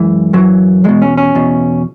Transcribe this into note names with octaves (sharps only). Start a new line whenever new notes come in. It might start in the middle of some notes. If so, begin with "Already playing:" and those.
Already playing: F#2 E3 G#3
F#2 E3 F#3
E2 B2 G#3
C#4
C#4
E2 B2